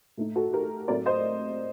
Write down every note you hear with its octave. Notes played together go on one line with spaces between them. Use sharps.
A2 A3 D#4
F#4 A4
G4 A#4
A2 F#3 A3 C4 A#4 D5
C5 D#5